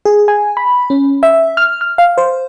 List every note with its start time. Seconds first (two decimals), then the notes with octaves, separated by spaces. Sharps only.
0.05 G#4
0.28 G#5
0.57 B5
0.90 C#4
1.23 E5
1.57 F6
1.81 F6
1.98 F5
2.18 C5